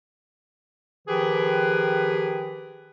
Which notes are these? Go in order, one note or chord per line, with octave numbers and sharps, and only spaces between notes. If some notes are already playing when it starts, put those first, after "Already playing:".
D#3 F3 G4 G#4 B4